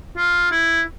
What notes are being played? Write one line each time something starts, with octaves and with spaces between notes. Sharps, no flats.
F4
E4